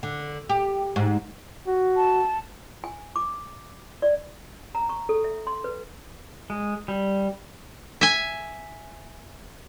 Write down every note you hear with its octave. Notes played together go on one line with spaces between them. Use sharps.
D3
G4
G#2
F#4
A5
G#5
D6
D5
A#5
C#6
A4
E5
C6
B4
G#3
G3
E5 G#5